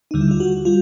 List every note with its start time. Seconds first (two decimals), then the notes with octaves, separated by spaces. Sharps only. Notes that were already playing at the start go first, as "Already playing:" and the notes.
0.11 D#2 D3 G3 D#4
0.21 E4
0.31 F4
0.40 F#4
0.65 G3 F4